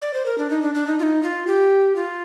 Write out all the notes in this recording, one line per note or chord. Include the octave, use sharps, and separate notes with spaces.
D5
C5
A#4
D4
D#4
D4
D4
D#4
F4
D#4
F4
G4
F4